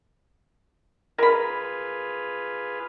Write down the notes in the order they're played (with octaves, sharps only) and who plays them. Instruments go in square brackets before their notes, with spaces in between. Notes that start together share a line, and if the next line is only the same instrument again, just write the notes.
[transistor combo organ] F4 G#4 B4 [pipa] A#4 B5